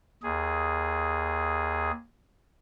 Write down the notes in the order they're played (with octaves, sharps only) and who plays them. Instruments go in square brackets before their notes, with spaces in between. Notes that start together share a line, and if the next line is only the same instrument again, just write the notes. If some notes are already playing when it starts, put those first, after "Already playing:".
[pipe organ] D#2 G#4